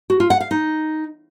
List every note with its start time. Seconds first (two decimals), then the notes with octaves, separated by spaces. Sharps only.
0.10 F#4
0.20 F4
0.30 F#5
0.41 F5
0.51 D#4